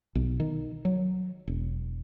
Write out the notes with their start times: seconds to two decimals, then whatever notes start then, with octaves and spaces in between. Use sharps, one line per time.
0.15 B1
0.40 D#3
0.85 F#3
1.47 E1